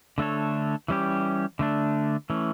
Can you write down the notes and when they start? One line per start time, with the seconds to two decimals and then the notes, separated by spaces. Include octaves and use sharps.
0.18 D3 A3 D4 A4 C#5
0.88 E3 G3 C#4 G4
1.59 D3 A3 D4
2.30 E3 A3 C#4